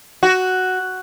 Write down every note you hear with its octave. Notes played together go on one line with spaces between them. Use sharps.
F#4